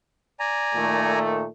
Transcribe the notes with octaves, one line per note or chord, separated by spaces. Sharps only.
D5 G#5 A#5
A#2 D#3 A3